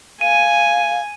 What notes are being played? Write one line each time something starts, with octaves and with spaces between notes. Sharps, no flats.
F5 G#5 D#7